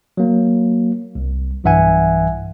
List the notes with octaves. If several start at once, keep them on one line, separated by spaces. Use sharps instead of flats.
F#3 A#3
C2
B1 G2 E3 E5 F#5 G#5